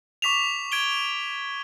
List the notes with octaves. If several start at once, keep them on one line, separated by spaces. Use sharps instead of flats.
C#6 D6 B6 E7 F7
G#6 D7 G7